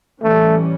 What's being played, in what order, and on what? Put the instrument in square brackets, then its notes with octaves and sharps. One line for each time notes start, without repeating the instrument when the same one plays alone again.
[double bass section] A2 E3 G3 C#4 [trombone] A3